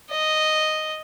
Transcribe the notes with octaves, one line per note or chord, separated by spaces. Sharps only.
D#5